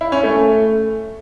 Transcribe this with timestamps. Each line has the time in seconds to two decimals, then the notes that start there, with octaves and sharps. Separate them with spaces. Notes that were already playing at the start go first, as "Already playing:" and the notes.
0.01 E4
0.12 C#4
0.23 A3